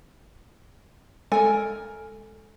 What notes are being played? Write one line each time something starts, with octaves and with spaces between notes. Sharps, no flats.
G#3 A4 A#4 G#5